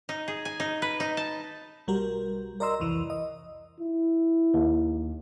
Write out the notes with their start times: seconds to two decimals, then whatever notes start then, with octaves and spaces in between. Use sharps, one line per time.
0.09 D#4
0.28 G#4
0.45 G#5
0.60 D#4
0.82 B4
1.00 D#4
1.17 A5
1.88 B1 G3 F#4 A#4
2.60 A#4 D5 D#5 A#5 C6 E6
2.80 C2 F2 E3
3.10 D#5
3.80 E4
4.54 D#2